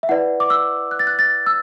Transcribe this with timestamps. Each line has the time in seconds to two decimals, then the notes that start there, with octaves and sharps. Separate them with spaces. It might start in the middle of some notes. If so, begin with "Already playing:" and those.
0.03 E5
0.09 E4 B4 D5 F#5
0.40 D6
0.50 E6
0.91 F#6
0.99 A6
1.07 F#6
1.19 A6
1.46 E6